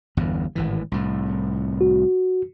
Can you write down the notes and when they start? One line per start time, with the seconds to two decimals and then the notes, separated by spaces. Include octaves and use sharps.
0.17 G1 E2 G2
0.55 G#1 A2 E3
0.92 C2 A2
1.81 F#4